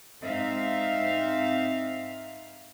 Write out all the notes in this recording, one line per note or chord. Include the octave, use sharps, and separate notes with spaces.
G#2 C4 D#4 E5 F5